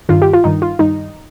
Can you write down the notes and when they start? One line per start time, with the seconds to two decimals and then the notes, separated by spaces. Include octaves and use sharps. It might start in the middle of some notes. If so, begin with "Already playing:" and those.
0.09 G2 D#3 F4
0.22 G4
0.33 F4
0.44 G2 D#3 D#4
0.62 F4
0.79 G2 D#3 D#4